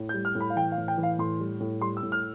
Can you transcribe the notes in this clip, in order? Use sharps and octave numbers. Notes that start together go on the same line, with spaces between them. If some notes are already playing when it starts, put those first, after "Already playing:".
Already playing: A2
G6
G3
F6
A2
B5
F5
E3 G5
F5
A2
G5
E3
F5
A2 C6
G3
A2
G3 C6
E6
A2
F6